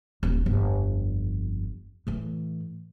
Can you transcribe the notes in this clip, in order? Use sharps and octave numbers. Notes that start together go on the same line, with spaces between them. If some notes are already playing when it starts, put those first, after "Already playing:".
D#1
G1 F2
A2 E3